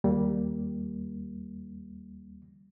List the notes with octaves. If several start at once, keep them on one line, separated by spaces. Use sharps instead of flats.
D#2 G3 A#3